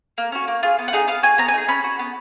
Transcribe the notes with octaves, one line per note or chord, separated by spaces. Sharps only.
A#3
C#4 F#4
A#3
F4 G#4
B3
F#5
D#4 G#4
B3 F5
F#4 G#5
B3 A#5
G#5
D#4 G#4
C#4 B5
F#4
B3